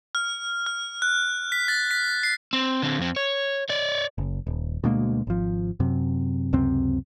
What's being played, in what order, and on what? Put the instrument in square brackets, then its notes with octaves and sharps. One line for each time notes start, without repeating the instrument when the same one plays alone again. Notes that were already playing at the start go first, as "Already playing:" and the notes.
[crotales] F6
F6
F#6
B6
A6
B6
C7
[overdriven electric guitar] C4
D3 C4
F2 C4
C#5
C#5 D5
[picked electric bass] F#1
D#1
D2 B2 G#3 A#3
G#1 F3
F#2 C3
C#2 F#2 C3 C4